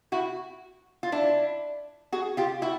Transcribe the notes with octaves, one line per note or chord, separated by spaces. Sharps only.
E4 F#4
F4
D4 E4
F#4 G#4
F4 G4
E4 F#4